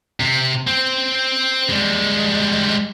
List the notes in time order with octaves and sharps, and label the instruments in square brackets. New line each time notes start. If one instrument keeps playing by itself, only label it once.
[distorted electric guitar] C3
C4
G3 G#3